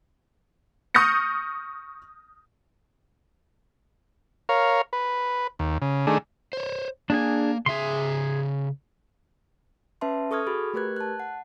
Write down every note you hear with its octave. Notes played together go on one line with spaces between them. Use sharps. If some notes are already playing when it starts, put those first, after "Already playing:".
C#6 D#6 F6 G6 A#6 C#7
A#4 C#5 F5
B4
D#2
C#3
D#3 A3 D4 G#4
C5 C#5
A#3 D4 G#4 G#5
C#3 G#4 E5 C6
C#4 B4 E5 A5 C6
A4 C#6 D#6 F6 G#6
F#4 G#4 B5
A3 G4 A#4 B4 F#6 G#6
A5 F#6
F#5